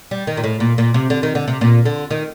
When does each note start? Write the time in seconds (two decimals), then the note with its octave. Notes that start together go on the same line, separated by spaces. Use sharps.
0.11 G3
0.27 D#3
0.37 A#2
0.44 A2
0.60 A#2
0.78 A#2
0.94 C3
1.10 D3
1.23 D#3
1.35 D3
1.48 C3
1.61 A#2
1.85 D3
2.11 D#3